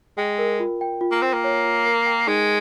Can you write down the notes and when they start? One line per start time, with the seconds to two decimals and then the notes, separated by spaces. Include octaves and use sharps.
0.17 G#3 G5
0.38 A#4
0.60 F4
0.81 G5
1.01 F4
1.12 A#3
1.23 C4 G5
1.33 A#3
1.44 C#5
1.65 F4
1.86 A#4
2.06 G5
2.27 G#3 D#4